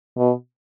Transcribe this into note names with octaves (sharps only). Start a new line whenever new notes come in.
B2